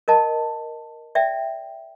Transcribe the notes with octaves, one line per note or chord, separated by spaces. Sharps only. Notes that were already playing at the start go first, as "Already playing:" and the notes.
A#4 D#5 A5
D5 E5 G5